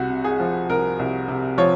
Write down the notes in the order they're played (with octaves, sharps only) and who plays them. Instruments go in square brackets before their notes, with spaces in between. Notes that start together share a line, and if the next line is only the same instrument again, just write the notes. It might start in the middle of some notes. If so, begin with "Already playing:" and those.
Already playing: [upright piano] C2 F#4
C3
G#4
F3
C2 A#4
C2
C3
F3 C#5